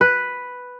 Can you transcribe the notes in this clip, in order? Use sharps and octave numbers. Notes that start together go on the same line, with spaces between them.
B4